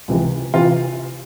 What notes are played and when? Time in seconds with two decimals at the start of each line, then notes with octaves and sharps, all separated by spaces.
0.08 C#2 C3 E3
0.54 C3 E3 F4